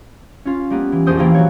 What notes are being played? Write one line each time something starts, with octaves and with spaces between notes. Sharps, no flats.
C#4 F4
G3 A#3 B3
E3
A#1 E2 C5 D#6 G6 D7
E3 A#3 F4 G5
F#3 F#4 C#5